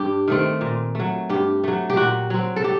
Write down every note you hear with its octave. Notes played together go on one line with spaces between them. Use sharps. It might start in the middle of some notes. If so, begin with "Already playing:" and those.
Already playing: G2 G4
D#3 A3 C4
A#2
F#3 A3
G2 G4
F#3 A3
G4
A#2 F#4
F#3 C4
A4
G4